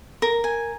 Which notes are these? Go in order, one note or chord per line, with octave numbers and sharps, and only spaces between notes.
A#4
G#5